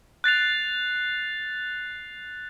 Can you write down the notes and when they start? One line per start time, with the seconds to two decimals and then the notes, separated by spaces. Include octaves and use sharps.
0.24 F#6 A6 C7 F7